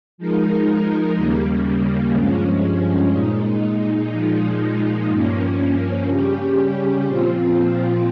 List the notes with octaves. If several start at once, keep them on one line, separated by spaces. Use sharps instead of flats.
F3 G#3 D#4 A#4
D#2 C#3 G3 A#3
G2 F3 G#3 C#4
A#2 G#3 D#4
A#2 F3 G#3 D#4
G2 F3 A#3 C#4
C#3 G3 C#4 G4
A#2 F3 C4 F4